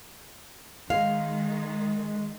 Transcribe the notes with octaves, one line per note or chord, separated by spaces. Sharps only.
D#3 G#3 F5